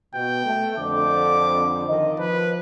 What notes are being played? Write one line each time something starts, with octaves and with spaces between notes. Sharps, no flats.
B2 G5
A3
F2 D3 D6
D#3 F3 D#5
F3 B4